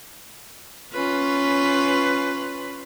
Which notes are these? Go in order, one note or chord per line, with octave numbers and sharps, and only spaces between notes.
C#4 F4 B4